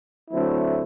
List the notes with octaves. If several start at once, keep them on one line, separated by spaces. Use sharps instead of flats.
D3 F#3 A3 C4 E4